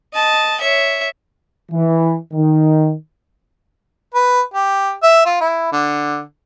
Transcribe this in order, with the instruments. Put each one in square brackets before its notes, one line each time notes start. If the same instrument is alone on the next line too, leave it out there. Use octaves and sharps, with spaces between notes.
[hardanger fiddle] D#5 A5
C#5 E5
[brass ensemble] E3
D#3
[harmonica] B4
G4
E5
F4
E4
D3